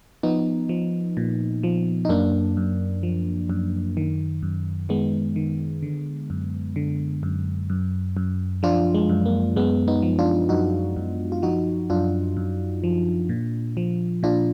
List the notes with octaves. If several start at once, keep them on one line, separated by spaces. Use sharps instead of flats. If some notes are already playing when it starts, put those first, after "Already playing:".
F3 B3 D#4
F3
A#2
F3
D#4
F#2 A#3 D4
F#2
F3
F#2
D#3
F#2
D#3 G#3 B3
D#3
D3
F#2
D3
F#2
F#2
F#2
F3 D4 F4
G#3
F#2
A#3
F#2 G#3 B3
B3 D#4
F3
D4 F4
F#2 D#4 F#4
F#2
F4
F3 D#4 F#4
F#2 D4 F4
F#2
F3
A#2
F3
A#2 D4 F4